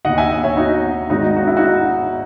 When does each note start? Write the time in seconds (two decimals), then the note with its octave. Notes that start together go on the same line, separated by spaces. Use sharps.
0.05 D#2 D#3 D#5 F#5
0.18 E5 G#5
0.31 D#5 F#5
0.44 C#5 E5
0.57 D#4 F#4
1.10 G#1 G#2 D#3 D#4 F#4
1.36 F#4
1.47 E4
1.57 D#4 F#4